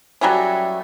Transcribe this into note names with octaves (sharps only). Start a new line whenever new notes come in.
F#3 G3 A3 C#4